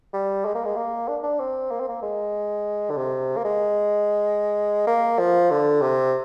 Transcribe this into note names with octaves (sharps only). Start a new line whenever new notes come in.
G3
G#3
A#3
G#3
A#3
D4
D4
C4
A#3
C4
A#3
G#3
D3
C3
A#3
G#3
A#3
F3
D3
C3